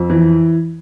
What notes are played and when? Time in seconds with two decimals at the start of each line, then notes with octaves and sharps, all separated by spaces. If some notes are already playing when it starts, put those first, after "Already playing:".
Already playing: F2
0.10 E3